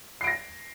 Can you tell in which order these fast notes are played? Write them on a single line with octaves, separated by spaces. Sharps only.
C7 D7 A#6